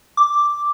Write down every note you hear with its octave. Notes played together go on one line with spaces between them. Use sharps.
D6